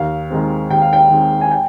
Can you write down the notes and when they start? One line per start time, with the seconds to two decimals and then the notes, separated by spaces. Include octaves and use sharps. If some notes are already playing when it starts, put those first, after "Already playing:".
Already playing: D#2 F5
0.30 D#3 G#3 C4
0.70 D#2 G5
0.82 F5
0.93 G5
1.10 D#3 G#3 C4
1.41 G#5
1.51 G5